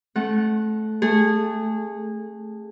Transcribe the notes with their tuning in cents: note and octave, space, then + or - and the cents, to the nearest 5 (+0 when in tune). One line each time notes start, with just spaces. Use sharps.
A3 -20 C4 +40 F#5 +0
A3 +0 G#4 -20